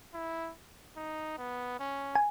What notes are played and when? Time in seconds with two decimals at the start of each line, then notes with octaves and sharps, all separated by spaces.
0.14 E4
0.96 D#4
1.38 B3
1.79 C#4
2.15 G#5